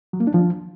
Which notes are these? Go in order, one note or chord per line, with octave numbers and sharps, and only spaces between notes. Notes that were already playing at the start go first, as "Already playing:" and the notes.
F#3
A#3
D4
F3